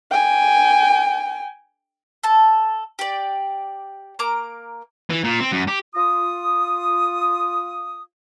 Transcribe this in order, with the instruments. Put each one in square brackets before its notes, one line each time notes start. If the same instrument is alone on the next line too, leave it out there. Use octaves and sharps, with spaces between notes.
[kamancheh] G5 G#5
[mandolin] A4 A5
G4 D5
A#3 A#5 D6
[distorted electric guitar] E3
A#2
C4
F#2
G4
[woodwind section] F4 D#6